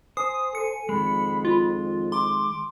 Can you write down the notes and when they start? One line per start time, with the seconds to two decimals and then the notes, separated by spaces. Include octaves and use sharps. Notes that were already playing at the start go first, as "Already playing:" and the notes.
0.17 C5 G#5 D#6
0.55 A4 C#7
0.89 F2 D#3 G#3 B5
1.45 F4
2.12 C6 D6